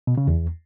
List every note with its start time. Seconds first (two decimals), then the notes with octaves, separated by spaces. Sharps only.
0.07 B2
0.18 C#3
0.28 E2